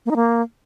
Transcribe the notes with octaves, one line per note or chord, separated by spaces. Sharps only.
A#3
D#4
A#3